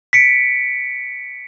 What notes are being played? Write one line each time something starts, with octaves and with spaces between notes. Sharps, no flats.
B6 C#7 D7